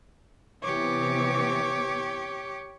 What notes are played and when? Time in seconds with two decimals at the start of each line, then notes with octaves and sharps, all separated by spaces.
0.63 C3 E3 B3 G4 C#5 D6